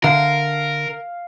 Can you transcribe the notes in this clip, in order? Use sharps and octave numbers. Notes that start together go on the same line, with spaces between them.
D3 A#4 F5